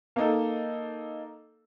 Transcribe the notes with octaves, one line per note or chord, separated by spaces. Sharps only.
A#3 D#4 A4